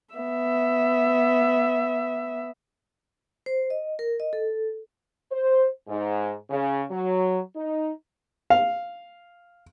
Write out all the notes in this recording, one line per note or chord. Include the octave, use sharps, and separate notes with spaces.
B3 E5
C5
D#5
A#4
D#5
A4
C5
G#2
C#3
F#3
D#4
F5